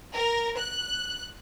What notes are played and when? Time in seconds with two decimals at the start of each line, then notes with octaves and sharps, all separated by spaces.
0.15 A#4
0.58 F#6